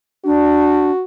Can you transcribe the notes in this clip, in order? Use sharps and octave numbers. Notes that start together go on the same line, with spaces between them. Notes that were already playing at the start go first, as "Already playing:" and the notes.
D4 F#4